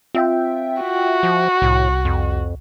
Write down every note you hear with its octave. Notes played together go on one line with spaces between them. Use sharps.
C4 F4 E5 G5
F#4
F3
C2 A2
F2